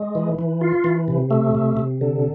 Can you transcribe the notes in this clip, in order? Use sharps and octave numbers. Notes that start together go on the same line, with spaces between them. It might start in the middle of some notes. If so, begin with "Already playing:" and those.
Already playing: G#3
E3
E3
F4
E3
C3
A3
C3
C3
D3